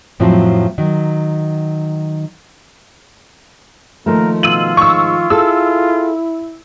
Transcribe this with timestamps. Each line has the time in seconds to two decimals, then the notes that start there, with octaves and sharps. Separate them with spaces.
0.20 F2 A2 F3 F#3 C4
0.78 D#3 F#3
4.06 D#3 F3 A3 A#3 A#4
4.43 B2 F4 E6 D#7 F#7
4.77 G#2 C#6 E6
5.30 E4 G#4 A4 E6